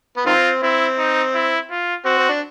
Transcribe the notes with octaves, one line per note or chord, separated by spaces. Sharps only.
B3
D#3 C4 F4
C4 E4
D#4
E4
F4
C4 F#4
C4
D4